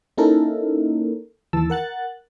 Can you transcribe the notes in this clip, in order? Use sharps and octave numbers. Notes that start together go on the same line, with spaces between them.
A#3 C#4 D#4 E4 A4 A#4
D#2 E3 A5 E6
A#4 F#5 F#6 A6